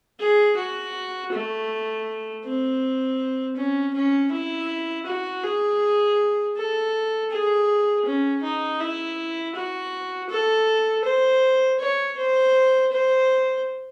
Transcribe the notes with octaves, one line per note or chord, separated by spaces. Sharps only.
G#4
F#4
A3
C4
C#4
C#4
E4
F#4
G#4
A4
G#4
C#4
D#4
E4
F#4
A4
C5
C#5
C5
C5